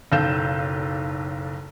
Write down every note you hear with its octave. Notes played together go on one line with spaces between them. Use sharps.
F#1 B1 A4 F5 G6 E7